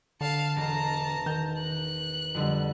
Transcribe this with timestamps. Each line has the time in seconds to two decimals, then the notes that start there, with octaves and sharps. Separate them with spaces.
0.21 D3 F5 A5
0.56 E1 A5 A#5
1.26 D#3 G6
1.58 F#6
2.34 F2 D3 G3